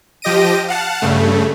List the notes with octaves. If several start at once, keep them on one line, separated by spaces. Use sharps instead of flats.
F3 G4 D#5 A#6 D7 D#7
F5 F#5 A5
G2 C#3 A3